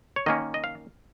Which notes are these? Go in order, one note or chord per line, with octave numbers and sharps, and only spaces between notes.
C#5
D#3 A#3 C#4 D#5
D#5
F5